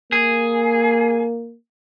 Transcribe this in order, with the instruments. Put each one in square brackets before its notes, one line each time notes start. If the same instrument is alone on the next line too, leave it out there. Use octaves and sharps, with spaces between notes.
[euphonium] A#3 [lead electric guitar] G#4